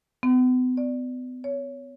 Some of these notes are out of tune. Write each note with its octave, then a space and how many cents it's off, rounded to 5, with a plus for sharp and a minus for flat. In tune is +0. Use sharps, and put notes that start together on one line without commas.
B3 +40
D5 +10
C#5 +15